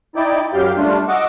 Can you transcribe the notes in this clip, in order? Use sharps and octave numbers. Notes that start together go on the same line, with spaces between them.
D#4 E4 D5 G5
F#2 F#3 G4 F5 G6
G3 A3 D4 F4
D#5 F#5 C#6 D6 E6